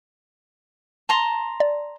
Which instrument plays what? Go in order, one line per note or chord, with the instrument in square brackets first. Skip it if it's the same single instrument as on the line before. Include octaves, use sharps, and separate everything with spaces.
[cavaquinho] A5 A#5 C6
[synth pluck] D5